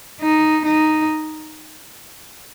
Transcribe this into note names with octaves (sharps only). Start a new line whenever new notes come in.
D#4
D#4